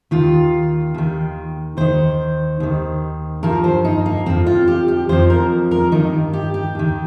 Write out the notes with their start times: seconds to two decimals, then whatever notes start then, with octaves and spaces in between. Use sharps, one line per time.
0.11 D#2 D#3 F4
0.94 D#2 D#3
1.77 D#2 D#3 C5
2.60 D#2 D#3
3.43 G2 F3 A#4
3.64 C5
3.85 D#4
4.06 A#3
4.26 F2 F3 C4
4.46 F4
4.68 G4
4.88 G4
5.09 F2 F3 C5
5.30 A#4
5.71 A#4
5.92 G2 D#3 D#4
6.34 G4
6.54 G4
6.75 D#2 D#3